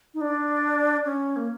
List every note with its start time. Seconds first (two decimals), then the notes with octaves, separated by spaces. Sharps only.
0.14 D#4
0.21 D4
1.05 C#4
1.36 A#3